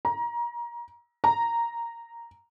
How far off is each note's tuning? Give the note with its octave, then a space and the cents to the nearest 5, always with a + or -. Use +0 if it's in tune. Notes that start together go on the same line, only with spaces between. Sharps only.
A#5 +25
A#5 -5